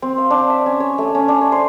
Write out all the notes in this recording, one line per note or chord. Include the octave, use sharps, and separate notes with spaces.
C4
F5
D4
E5
C#4
C#5
A3
C#4
D4
C#5
C5